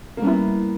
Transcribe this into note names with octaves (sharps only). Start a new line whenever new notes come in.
A#3
G3 B3 C#4 E4